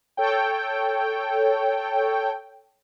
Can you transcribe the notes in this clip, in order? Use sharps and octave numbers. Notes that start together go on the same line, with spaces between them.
A4 C#5 G5